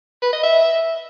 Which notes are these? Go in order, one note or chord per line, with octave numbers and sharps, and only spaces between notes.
B4
D#5
E5